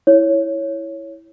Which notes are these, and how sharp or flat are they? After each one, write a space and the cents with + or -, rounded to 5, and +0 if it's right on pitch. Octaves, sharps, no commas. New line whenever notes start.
E4 +0 C#5 +0